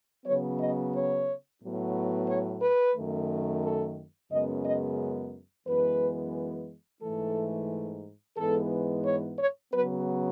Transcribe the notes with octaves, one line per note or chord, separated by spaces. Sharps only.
C#3 F#3 B3 C#5
D#5
C#5
A2 F#3 B3
C#5
B4
F#2 D#3 A3
A4
F#2 C#3 G#3 B3 D#5
D#5
F#2 E3 G#3 B3 B4
G#2 E3 A3 A4
G#2 E3 G#3 B3 A4
C#5
C#5
C#3 F#3 B3 B4